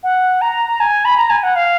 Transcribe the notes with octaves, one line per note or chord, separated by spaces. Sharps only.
F#5
A#5
G#5
B5
A#5
G#5
F#5
F5